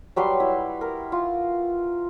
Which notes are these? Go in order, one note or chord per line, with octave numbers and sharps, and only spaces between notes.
F#3 G3 B4 C6
E4
A#4
F4